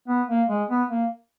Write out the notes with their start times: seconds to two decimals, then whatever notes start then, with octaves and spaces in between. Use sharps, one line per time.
0.08 B3
0.28 A#3
0.49 G#3
0.69 B3
0.90 A#3